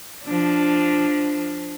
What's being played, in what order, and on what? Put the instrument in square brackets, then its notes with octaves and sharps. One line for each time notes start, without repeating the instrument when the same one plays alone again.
[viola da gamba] F3 D4